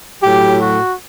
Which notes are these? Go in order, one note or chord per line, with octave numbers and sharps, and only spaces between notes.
A2 F#3 G4
F#4